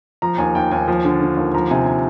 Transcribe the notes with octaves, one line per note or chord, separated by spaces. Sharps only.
F3 A#5
D#2 G#5
D#2 G5
D#2 G#5
F3
D3
D3
D#2
F3 A#5
C3 G#5
G#5